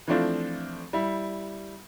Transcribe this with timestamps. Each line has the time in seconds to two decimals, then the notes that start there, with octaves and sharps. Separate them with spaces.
0.07 E3 F3 A3 C4 D4 F4
0.93 G3 E4